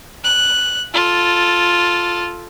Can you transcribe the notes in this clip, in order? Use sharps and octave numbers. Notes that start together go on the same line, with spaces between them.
F#6
F4 A4